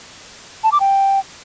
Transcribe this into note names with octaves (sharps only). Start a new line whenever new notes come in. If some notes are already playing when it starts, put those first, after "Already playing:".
A5
D6
G5